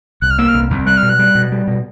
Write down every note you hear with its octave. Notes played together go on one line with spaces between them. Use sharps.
C2 F#6
F6
A#3 E6
F6
C2
C2
G3 F#6
F6
B2
F#6
G3
B2
G3
B2